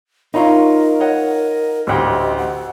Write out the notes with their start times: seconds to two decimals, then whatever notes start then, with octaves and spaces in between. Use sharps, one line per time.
0.34 D#4 F4 A#4 C#5 A#5 C#6
1.00 C#5 D#5 F#5
1.87 A1 D2 G4 D#5
2.37 F#5